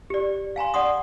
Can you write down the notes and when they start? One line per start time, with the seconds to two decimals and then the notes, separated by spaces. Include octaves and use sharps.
0.10 G4 D5
0.56 F5 G#5 A#5 C6
0.74 D5 F#5 C6 D#6